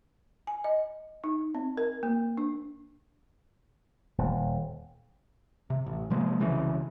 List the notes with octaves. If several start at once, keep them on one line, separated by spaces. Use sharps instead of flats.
G#5
D#5
D#4
C4
A#4
A#3
D4
D#1
C3
A1
C3 F3 G#3 A#3
C2 C#3 E3